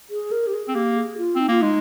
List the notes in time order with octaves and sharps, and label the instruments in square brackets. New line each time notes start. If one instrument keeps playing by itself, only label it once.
[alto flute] G#4
A#4
G4
G#4
[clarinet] C4
[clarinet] A#3 [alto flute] G4
[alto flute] G#4
F4
[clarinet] C4 [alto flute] D#4
[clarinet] A#3 [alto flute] F4
[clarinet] G#3 [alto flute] D#4